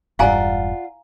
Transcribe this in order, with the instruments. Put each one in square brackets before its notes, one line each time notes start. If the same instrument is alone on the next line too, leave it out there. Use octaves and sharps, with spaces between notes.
[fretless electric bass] E1 G2 [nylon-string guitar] F4 D5 F#5 [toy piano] F5 G#5 A#5